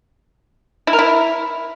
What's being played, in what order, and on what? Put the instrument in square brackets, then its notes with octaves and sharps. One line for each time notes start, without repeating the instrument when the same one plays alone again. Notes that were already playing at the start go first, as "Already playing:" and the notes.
[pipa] E4
A#4
E4